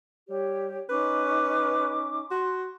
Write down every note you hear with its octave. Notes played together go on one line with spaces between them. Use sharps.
G3 G4 C#5
C#4 D#4 B4 D6
F#4 C6